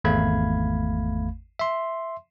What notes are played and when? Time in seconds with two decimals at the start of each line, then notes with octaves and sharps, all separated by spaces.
0.04 G#1 E2 A3 F5 B5 G#6
1.59 E5 C6